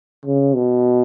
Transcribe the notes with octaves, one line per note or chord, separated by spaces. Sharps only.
C#3
B2